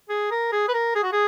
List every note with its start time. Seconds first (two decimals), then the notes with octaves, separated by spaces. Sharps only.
0.09 G#4
0.31 A#4
0.52 G#4
0.68 B4
0.74 A#4
0.95 G#4
1.03 F#4
1.12 G#4